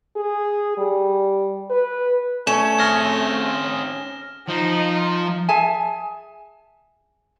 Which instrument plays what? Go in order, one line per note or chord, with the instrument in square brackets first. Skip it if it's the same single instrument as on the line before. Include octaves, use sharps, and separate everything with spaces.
[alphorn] G#4
G3
B4
[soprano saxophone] A3 [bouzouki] C#4 [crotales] E7
[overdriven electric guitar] C4 G#4 [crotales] F6 A#6
[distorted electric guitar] F3 [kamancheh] D#4
[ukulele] G#4 E5 G#5 A5